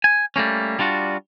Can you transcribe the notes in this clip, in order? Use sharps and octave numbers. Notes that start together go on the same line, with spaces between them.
G#5
G3 A3 A#3 C#4
G3 D4 F4 F#4